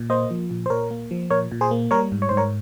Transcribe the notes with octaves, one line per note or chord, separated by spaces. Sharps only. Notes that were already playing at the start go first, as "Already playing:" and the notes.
Already playing: A#2
A#3 C5 D#5
F3
A#2
C5
A#2 A#4 C#5
A#3
F3
A#2 A#4 C#5
A#2
G#4 C5
A#3
G3 A#4 C#5
G#2
C#5
G#2 C5
A#4 C#5